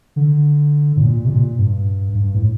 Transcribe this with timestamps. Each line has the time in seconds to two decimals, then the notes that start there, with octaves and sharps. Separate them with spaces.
0.16 D3
0.97 A2
1.01 A#2
1.25 C3
1.30 A#2
1.58 G2
2.15 G2
2.35 A2